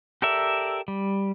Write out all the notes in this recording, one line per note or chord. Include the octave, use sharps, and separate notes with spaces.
G4 A4 A#4 D5 E5
G3